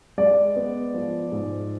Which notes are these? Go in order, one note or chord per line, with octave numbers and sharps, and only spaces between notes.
G#3 D5
B3
F3
G#2